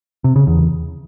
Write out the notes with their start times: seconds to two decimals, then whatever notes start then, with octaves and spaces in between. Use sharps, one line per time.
0.24 C3
0.36 C#3
0.47 E2